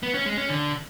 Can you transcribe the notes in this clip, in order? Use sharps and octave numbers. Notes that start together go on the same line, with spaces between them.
B3
C#4
G#3
C#4
D3